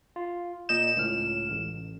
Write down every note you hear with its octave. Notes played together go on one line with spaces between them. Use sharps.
F4
A#2 D#5 G6 E7
C#2 A2 F6
A1